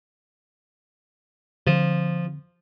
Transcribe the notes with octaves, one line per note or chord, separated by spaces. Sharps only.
D3 F3 C4